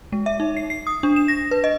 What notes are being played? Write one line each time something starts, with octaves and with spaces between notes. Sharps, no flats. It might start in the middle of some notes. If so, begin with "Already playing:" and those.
G#3
E5
D#4
C7
C7
D#6
D4
E7
A#6
B4
D#5